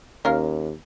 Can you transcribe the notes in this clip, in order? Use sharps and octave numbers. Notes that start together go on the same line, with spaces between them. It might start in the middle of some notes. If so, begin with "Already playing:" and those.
D#2 C#4 A#4 F5